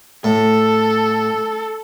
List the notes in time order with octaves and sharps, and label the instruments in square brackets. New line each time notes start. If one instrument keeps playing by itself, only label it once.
[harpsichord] A2 [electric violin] A4